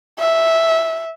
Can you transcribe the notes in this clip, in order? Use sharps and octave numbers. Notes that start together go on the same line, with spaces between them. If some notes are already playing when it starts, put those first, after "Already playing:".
E5